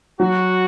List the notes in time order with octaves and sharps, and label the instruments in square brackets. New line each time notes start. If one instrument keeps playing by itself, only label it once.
[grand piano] F#3 [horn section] F#4